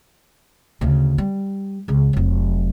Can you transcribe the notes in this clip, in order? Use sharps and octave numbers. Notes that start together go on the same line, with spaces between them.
D2 C#3
G3
C#2 C#3
F1 F#3